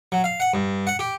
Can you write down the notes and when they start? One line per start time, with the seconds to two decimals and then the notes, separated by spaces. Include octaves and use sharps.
0.12 F#3
0.24 F5
0.40 F#5
0.54 G2
0.87 F#5
0.99 G4